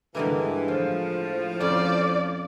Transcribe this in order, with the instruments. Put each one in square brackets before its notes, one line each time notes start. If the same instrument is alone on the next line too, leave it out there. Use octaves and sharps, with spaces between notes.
[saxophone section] G2 E3 [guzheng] D3 G#3 A#3
[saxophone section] A2 F3 [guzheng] F4
[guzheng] F2 C#4 F4 [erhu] D5